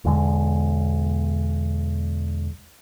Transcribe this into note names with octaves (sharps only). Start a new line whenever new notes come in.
B1 E2 D3 G#3